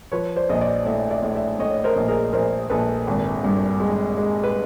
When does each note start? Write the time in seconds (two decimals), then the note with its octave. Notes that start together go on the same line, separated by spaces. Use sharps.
0.12 F3 B4 C#5
0.36 C5 D5
0.49 A#1 D#5
0.61 C5 D5
0.85 A2 D5 E5
1.11 D5 E5
1.22 A2
1.35 D5 E5
1.59 A2 C#5 D#5
1.84 A#4 C5
1.96 A#1
2.08 G#4 A#4
2.33 A#1 A#4 C5
2.70 A#1 A4 B4
3.07 G#1
3.44 G2
3.80 G#3
4.17 G#3
4.44 B4